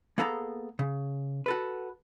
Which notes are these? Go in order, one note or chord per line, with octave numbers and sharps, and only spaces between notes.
A#3 B3 G#4 A4 G#5 A#5
C#3
F#4 A4 B4